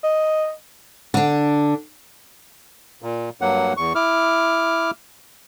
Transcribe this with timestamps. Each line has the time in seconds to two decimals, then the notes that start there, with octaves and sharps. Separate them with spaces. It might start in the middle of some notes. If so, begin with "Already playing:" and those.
0.04 D#5
1.14 D3 D4
3.02 A#2
3.41 G2 F#3 A#3 F#5
3.77 E2 C#6
3.95 E4 D6 F6